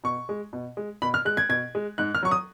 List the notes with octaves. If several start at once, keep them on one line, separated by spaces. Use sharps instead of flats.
B2 C#6
G#3
B2
G#3
B2 B5
F6
G#3 F#6
G#6
B2 G#6
G#3
G#2 F#6
F6
F#3 C#6
D#6